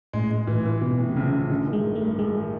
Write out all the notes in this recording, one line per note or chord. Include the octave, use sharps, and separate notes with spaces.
A2 G#3
G#3
A2 E3
E3
B2 E3
A2
C3
A#1 C#3
A#1
C#3
A1 D3
D#3
G#3
G2
A3
G2
A1 G#3
D#3